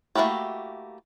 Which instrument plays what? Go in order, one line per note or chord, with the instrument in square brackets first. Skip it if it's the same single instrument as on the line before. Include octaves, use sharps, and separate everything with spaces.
[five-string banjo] A3 A#3 E4 F#4 G4